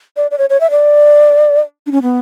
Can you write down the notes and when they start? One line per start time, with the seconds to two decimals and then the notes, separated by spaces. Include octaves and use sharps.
0.17 D5
0.31 D5
0.38 C#5
0.50 C#5
0.60 E5
0.71 D5
1.86 D4
1.92 C#4
2.02 B3